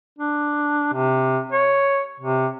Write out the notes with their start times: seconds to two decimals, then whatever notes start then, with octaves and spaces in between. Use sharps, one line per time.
0.19 D4
0.94 C3
1.52 C#5
2.20 C3